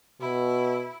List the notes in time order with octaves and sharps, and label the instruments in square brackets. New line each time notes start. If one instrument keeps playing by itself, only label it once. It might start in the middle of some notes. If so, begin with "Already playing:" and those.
[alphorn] B2 [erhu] E4